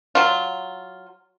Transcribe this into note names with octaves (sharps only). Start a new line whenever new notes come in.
F#3 F4